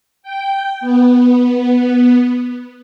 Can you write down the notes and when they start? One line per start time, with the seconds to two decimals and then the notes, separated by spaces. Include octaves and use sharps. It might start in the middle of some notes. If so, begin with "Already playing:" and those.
0.23 G5
0.81 B3